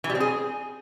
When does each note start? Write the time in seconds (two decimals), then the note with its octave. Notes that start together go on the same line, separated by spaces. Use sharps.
0.04 E3
0.10 G3
0.15 C4
0.20 G#4